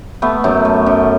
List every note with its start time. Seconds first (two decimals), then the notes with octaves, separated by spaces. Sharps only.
0.22 A3 B3
0.44 F#2 A3
0.65 A3
0.86 F#2